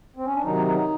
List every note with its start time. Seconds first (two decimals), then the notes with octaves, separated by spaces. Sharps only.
0.17 C4
0.25 C#4
0.34 D4
0.43 C3 D#3 F#3 D#4